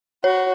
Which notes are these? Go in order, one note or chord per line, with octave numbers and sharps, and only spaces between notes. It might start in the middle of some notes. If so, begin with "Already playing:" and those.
F#4 C#5